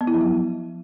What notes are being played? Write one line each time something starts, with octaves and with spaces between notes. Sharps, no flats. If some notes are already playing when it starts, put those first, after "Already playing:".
B3
E4
F3
F#3